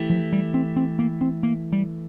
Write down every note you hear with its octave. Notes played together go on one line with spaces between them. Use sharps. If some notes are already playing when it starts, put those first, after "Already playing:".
Already playing: E3 A3 E4 G4
F3
G3
C4
C4
A#3
C4
A#3
G3